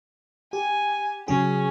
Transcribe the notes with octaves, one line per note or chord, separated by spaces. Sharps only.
G4 G#5
C#3 F#3 C#4 G#4